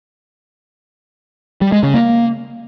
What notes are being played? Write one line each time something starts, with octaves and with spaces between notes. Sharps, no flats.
G3
G#3
C#3
A#3